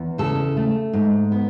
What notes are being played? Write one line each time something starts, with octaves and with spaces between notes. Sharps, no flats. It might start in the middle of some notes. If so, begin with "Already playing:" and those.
Already playing: E2
C#3 A4
A3
G#2
B3